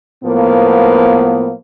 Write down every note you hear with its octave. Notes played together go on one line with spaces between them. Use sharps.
A2 F3 A#3 B3